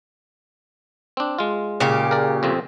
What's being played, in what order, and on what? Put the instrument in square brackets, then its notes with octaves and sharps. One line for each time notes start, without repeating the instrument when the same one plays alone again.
[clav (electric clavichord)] C4 D4
G#3 F4
[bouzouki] A#2 C#3 G4
[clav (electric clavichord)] A#4 D5
F2 C3 C4